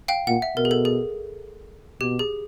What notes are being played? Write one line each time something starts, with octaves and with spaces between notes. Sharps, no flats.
F5 G5
A#2 F#5
E5
B2 A#4
G#4
A4
G#4
B2 G4
G#4